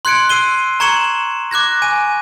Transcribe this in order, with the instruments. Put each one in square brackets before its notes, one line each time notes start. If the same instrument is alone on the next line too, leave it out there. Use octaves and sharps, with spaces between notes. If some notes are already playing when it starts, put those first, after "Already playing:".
[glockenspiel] C6 F#6 G#6 C#7 D7
E6 C7 D#7 G7
A#5 C#6 G#6 C#7 E7 F#7
D6 F#6 G#6 A#6
G#5 D#7